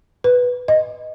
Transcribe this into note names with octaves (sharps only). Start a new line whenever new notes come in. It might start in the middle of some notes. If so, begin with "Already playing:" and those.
B4
D#5